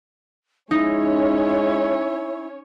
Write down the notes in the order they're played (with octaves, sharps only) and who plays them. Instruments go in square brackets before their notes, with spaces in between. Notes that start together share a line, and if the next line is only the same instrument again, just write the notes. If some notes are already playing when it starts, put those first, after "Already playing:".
[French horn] G#3 [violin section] C#4 C#5 [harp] D#4 [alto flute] E4